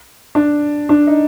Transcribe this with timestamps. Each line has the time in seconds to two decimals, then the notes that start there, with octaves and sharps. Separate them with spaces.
0.35 D4
0.89 D4
1.07 D#4